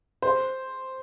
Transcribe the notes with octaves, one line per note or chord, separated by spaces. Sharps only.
C5